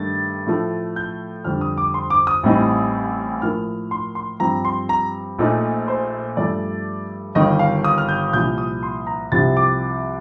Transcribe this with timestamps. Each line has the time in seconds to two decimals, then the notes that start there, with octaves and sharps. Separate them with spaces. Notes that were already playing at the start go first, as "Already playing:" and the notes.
Already playing: G2 D#3 A3 D4 A6
0.46 A2 F3 A3
0.96 G6
1.45 F2 D3 G3 F6
1.61 D#6
1.78 D6
1.94 C6
2.10 D6
2.27 D#6
2.43 A1 A2 G3 C4 D#4
3.42 A2 F3 A#3 F6
3.91 C6
4.15 C6
4.40 G2 F3 C4 A#5
4.65 C6
4.89 A#5
5.39 A#1 A#2 A3 D#4
5.88 C5
6.37 G2 F3 A3 D5
7.35 G1 G2 D#3 D#5
7.59 F5
7.84 D#6
7.98 F6
8.09 G6
8.33 C2 A#2 F3 G6
8.58 D#6
8.83 C6
9.07 A#5
9.32 C2 C3 F3 C4 A6
9.57 D6